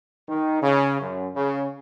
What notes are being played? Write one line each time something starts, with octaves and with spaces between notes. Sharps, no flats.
D#3
C#3
F#2
C#3